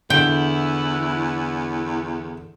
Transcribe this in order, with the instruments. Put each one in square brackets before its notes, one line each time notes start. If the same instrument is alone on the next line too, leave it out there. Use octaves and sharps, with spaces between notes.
[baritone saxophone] E2 [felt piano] D3 [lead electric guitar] E4 E5 [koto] G5